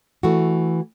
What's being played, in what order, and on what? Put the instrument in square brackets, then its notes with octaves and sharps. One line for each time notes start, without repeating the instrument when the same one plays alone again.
[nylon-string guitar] E3 A3 F#4